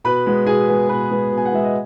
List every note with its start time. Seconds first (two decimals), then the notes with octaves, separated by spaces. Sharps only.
0.04 B2 B4 B5
0.26 G#3 B3
0.47 B2 G#4 G#5
0.68 G#3 B3
0.89 B2 B4 B5
1.11 G#3 B3
1.32 B2
1.37 G#5
1.45 F#5
1.52 G#3 B3 E5
1.64 D#5